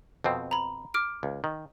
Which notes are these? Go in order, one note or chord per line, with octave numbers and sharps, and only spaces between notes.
F2 B2 C4
A#5 B5
D6 F6 D7
C#2
D#3